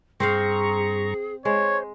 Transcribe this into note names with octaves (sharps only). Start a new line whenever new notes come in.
G2 C4 G#4 C5 F5 A#5 C#6
G#3 C5 C#5